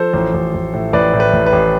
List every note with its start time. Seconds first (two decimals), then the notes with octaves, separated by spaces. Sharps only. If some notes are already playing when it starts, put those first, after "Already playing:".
Already playing: F3 A4 C5
0.13 A1
0.34 A1
0.54 A1
0.74 A2
0.93 A1 B4 D5
1.13 A2
1.20 B4
1.33 A1
1.46 B4
1.53 A1